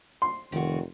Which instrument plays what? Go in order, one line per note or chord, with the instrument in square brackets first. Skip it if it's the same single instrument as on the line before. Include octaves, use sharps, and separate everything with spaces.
[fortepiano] C6
[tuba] F1 [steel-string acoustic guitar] D#3 F#4